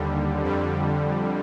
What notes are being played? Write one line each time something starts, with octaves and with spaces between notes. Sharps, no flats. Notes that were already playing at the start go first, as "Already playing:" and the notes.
Already playing: D#2 D3 G3
F2 D3 G3